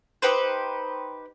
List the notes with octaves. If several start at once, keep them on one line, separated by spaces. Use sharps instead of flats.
D#4 G4 B4 C5